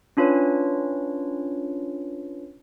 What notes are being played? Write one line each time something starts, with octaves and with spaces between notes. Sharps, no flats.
C#4 D4 F4 B4 C#5